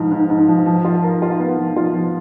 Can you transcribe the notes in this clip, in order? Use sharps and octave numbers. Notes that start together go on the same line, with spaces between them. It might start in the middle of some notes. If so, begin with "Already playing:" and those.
Already playing: G#2 F3
G#2
G#2
F3
F3
F4
A#4
F4
B3
F3
F4
F3